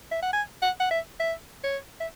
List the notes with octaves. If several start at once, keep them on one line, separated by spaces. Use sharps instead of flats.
E5
F#5
G#5
F#5
F#5
E5
E5
C#5
E5